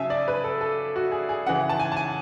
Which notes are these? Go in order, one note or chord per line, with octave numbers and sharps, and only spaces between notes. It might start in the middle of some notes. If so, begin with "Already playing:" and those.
Already playing: C#3 F#3 E5 G#5 A5
D5
B4
A4
A4
F#4
G#4
G#4
C#3 E3 F#5
A5
G#5
A5
G#5